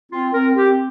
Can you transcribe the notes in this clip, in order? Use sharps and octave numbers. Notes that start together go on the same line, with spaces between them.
C4 F4
C4 A#4
C4 G4